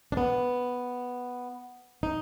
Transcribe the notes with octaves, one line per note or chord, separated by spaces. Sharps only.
D4
B3
D#4